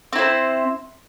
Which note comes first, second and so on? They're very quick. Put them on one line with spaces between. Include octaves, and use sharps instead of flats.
C4 E4 C5